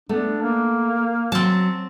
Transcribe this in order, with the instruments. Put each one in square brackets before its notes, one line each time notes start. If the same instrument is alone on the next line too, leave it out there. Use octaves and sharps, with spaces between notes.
[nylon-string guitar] A3 B3 [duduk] D4
[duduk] A#3
[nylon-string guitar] F#3 [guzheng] C4 A5